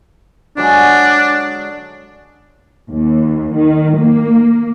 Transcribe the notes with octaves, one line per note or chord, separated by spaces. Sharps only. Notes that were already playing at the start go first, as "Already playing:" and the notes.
D3 F#3 G#3 D4
D#2
D#3
A#3